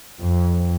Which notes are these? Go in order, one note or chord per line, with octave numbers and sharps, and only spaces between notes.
F2